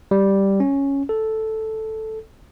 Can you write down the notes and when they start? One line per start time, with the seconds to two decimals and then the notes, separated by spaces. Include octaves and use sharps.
0.11 G3
0.60 C#4
1.09 A4